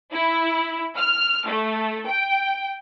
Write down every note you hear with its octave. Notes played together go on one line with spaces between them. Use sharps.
E4
F6
A3
G5